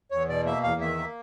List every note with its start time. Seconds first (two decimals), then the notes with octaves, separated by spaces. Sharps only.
0.11 E2 C#5
0.28 B2 D5
0.46 A#3 E5
0.63 E2 F5
0.81 D#3 E5
0.98 A#3